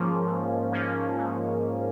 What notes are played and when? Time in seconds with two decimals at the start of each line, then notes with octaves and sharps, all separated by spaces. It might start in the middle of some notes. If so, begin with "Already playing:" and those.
Already playing: G#2 F3 A#3 C#4
0.26 G#2
0.72 F3 A#3 C#4
1.17 G#2